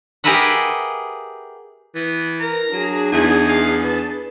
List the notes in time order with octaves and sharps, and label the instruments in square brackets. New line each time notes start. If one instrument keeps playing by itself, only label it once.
[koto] G4 G#4 A#4 B4 E5 F#5
[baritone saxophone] E3 [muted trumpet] B3
[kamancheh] A#4 [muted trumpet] A#5
[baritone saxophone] F#3 [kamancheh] D4 G#4
[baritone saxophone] E2 [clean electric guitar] D#4 E4 [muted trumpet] G#5
[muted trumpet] F5
[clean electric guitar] B4 [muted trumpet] A5